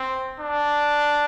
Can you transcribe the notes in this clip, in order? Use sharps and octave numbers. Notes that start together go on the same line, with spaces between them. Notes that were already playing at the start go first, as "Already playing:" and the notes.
Already playing: C4
D4